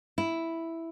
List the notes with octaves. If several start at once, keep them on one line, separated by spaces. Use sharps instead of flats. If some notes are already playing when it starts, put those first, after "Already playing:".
E4